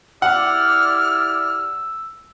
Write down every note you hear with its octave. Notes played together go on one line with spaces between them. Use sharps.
E4 G4 D5 F#5 E6 F6